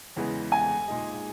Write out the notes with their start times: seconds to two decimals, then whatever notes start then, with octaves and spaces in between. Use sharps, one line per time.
0.16 E2 C#3 E3 G#3 B3
0.52 G#5
0.88 A#2 G#3 D#4 G#4 D#5